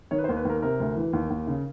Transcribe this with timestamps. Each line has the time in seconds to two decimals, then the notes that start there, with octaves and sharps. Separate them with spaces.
0.11 D#3 C#5
0.18 B4
0.24 C5
0.29 D#2
0.37 B4
0.45 D#2 A#4
0.62 C3 A#4
0.80 D2
0.96 E3
1.13 D#2
1.30 D#2
1.47 C#3